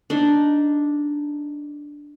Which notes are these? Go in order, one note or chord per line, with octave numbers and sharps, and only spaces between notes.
D4 D#4